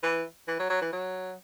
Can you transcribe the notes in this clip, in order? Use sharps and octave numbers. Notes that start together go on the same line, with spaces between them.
E3
E3
F#3
F#3
E3
F#3